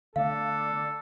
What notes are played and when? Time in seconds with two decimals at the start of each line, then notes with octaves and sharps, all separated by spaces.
0.16 D3 A3 B3 D4 A4 F5